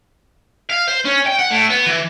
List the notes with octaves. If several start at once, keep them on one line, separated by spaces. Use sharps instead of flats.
F5
C5
C#4
G5
F#5
A2
B3
E3